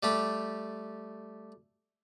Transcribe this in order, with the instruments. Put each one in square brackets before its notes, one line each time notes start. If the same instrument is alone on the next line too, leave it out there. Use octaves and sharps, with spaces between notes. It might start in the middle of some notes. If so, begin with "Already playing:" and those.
[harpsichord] G3 A3 G4